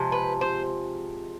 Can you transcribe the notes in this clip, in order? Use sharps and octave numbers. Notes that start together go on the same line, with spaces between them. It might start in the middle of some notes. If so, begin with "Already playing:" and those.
Already playing: C3 F3 G#3
B4
C5